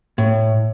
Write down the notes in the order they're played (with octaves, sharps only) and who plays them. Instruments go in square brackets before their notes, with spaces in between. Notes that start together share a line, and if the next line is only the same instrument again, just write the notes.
[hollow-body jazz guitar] A2